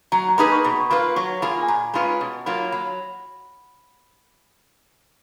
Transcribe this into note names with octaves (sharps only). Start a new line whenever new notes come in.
F#3 A#5
A#5
A#3 D#4 G#4 B4 B5
C#6
B2 B5
C#6
A#3 F4 B4 B5
F#3 C#6
A#3 F4 G#4 B5
G#5
A#2 A#5
G#3 C#4 F4 B4 B5
B2
F#3 A#3 F4 B5
F#3 B5